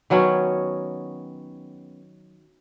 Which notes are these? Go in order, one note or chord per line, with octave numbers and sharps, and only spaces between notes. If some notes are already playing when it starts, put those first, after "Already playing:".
D#3 F#3 B3 C#4